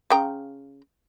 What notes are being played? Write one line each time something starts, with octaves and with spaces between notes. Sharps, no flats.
C#3 G5 A#5